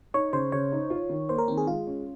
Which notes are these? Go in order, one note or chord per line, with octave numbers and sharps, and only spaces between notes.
D#4 C#5
C#3 C5
C#3 C#5
D#4
F4
D#3
A#3 C5
A#4
D#3 C4
G#4
G#3 F4
C#4